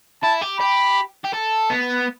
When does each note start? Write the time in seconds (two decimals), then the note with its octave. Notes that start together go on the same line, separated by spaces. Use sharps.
0.23 E4 A5
0.41 G4
0.59 G4 B5
1.24 G4
1.33 A4
1.70 B3